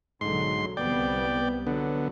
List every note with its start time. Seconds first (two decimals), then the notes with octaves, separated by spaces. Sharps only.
0.21 B1 G#2 D3 F#3 C6
0.77 C2 G3 B3 D5 G5
1.67 D3 F#3 B3